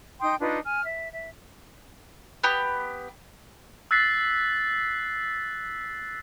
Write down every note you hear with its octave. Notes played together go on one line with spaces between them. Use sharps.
D#4 G5 C6 D#6
D4 D#4 F4 B4
G#5 F6
E5
E5
B3 G4
E6 F#6 A6 B6 C7